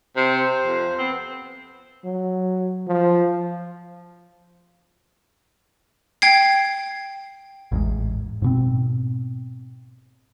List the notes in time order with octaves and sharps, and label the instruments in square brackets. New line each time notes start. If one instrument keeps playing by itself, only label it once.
[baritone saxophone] C3 [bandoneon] C5
[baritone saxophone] F2
[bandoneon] B3 [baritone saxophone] C4
[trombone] F#3
F3
[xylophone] G5 G#6 C7
[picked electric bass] A1 E2 G#2
G#2 B2 C4